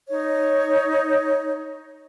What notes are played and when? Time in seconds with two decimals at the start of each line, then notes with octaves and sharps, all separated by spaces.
0.09 D#4 C#5